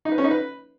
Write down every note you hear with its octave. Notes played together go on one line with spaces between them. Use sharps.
D#4
B4
C#4
D#4
B4